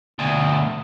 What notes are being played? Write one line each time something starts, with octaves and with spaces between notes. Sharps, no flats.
D2 B2